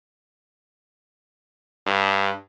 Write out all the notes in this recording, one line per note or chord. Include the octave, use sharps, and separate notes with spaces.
G2